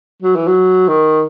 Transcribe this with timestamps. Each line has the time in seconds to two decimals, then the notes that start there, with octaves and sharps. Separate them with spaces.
0.23 F#3
0.36 E3
0.48 F#3
0.88 D#3